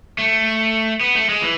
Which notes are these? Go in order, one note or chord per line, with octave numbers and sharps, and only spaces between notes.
A3
B3
A3
G#3
E3